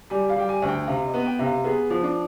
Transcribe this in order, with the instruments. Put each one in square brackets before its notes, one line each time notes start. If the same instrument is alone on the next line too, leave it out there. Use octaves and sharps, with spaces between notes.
[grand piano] G3 [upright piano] G#5
[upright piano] F5
[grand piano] G3 [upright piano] G5
[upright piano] G#5
[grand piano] D2
[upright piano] G5
[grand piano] C3 [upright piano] F5
[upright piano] D#5
[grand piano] B3
[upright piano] G5
[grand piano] C3
[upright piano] F5
[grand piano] B3 [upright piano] G#4
[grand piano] F3
[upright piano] D4